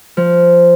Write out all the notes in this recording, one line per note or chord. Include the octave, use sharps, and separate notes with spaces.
F3